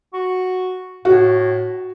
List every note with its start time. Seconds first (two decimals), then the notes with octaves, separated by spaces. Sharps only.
0.14 F#4
1.05 A2 F#4